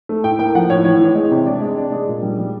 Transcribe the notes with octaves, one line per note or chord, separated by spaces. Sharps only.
A3
A2 G5
A#3 G5
F3 F#5
A2 C#5
E3 C#5
E3
G#3
C3
D4 D5
G#3
D4
G#3
A#2
G3
G3